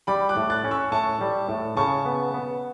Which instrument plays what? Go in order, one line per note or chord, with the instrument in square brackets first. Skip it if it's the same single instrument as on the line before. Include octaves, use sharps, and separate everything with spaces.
[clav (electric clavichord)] G3 [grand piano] B5 D6
[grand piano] D6 F#6
[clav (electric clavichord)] A2
[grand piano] F#6 A6
[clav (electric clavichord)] C#4
[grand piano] C#6 E6
[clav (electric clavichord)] A2 [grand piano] A5 C#6
[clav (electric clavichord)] G3
A2
[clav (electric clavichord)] C#3 [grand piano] A5 C#6
[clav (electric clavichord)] B3
B3